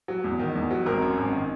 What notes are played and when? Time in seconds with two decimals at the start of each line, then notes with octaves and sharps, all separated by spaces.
0.08 F#3
0.24 E2
0.39 D#3
0.55 E2
0.71 F#3
0.86 G#1 A#4
1.02 F#2
1.18 G#1
1.33 D#3